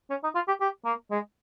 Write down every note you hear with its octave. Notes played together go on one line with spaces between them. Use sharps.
C#4
D#4
F4
G4
G4
A#3
G#3